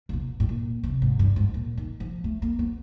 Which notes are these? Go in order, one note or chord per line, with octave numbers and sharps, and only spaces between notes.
C3
B2
A2
A#2
C3
G#2
G2
G#2
A#2
D#3
F3
A3
A#3
B3